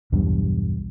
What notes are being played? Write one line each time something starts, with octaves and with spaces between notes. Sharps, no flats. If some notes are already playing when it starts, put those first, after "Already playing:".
B1 E2 G2